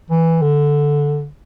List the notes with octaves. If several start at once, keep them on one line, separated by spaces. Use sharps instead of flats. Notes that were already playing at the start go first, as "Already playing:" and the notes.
E3
D3